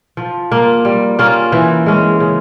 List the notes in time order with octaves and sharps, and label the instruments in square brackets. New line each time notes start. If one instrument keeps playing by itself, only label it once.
[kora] F3
A#3 F4
G3
A#3 C#4 F4
E3
G#3 C#4
C#3